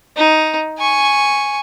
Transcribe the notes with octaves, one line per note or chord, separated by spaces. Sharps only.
D#4
G#5 C#6